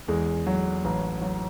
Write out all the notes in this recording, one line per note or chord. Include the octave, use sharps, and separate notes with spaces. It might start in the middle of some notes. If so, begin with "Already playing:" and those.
E2 G#3
F#3
A1
F#3